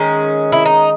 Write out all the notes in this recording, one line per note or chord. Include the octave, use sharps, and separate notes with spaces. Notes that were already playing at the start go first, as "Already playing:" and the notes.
Already playing: D#3 G#3 C#4
E4
D#4